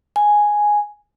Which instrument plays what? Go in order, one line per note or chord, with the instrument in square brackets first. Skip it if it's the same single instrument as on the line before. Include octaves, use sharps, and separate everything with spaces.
[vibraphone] G#5